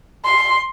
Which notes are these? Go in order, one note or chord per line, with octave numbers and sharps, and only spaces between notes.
C6